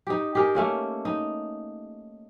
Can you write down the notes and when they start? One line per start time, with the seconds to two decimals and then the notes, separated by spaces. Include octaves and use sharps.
0.07 D#4 G4
0.35 G4 G#4 A#4
0.55 A3 A#3 C#4
1.05 D#4